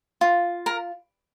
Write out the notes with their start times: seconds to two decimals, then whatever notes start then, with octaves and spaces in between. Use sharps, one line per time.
0.21 F4
0.66 A#4